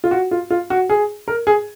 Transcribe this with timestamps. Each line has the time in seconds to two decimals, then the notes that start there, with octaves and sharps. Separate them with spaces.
0.04 F4
0.11 F#4
0.31 F4
0.51 F4
0.70 F#4
0.89 G#4
1.28 A#4
1.47 G#4